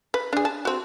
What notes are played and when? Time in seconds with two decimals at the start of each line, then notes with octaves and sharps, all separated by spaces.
0.14 B4
0.33 D4 G#4
0.45 A5
0.65 C4 F#4